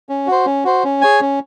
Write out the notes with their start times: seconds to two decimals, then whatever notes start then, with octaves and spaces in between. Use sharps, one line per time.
0.09 C#4
0.27 F#4 C5
0.45 C#4
0.64 F#4 C5
0.84 C#4
1.01 G#4 C#5 G#5
1.21 C#4